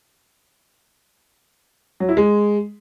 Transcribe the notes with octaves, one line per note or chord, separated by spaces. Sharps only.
F#3
E4
G#3